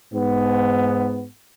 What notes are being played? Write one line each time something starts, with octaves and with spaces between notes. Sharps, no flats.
G#2 B3